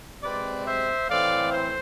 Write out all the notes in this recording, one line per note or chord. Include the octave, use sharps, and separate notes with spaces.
C3 G#3 C4 B4 D5
C5 E5
A2 E3 A3 C4 D5 F5
C5